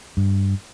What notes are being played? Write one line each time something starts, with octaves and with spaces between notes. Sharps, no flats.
G2